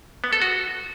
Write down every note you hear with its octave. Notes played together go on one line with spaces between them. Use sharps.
B3
A4
F#4